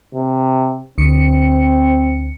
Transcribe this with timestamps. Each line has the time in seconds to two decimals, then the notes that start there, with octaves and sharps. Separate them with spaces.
0.15 C3
0.98 D2 C4 C#7